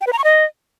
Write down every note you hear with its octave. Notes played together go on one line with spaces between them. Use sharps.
G5
B4
A#5
C#6
D#5